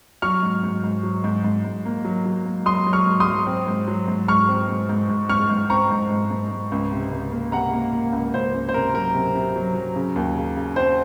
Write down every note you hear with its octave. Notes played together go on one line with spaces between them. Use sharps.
F#3 C#6 F6
G#2
G#2
G#2
F#3
G#2
G#2
G#2
A#3
F#3
F#3
A#3
F#3 C6 D#6
F#3
C#6 F6
G#2
C6 D#6
F#3
C4
G#2
F#3
G#2
G#2 C#6 F6
C4
G#2
G#2
G#2
G#2 C#6 F6
G#2
C4 A#5 C#6
G#2
G#2
G#2
G#2
C#2
C3
C#2
A#3
C3 F#5 A#5
A#3
A#3
C#2
C#2 C5
C#2
C5
C3 A#4
F#3 A#4
C3
C3
F#3
F#3
C#3
D#2
C#3
C#3
C4 C5